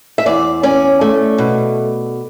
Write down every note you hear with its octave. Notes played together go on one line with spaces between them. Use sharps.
E5
E2 D5
C#4 D5
A3
B2